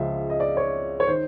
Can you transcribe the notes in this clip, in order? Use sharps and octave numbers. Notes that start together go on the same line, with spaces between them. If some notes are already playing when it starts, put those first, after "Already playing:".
Already playing: C#2 C#3 F3 E5
D#5
D5
C#5
C#5
D#3 C5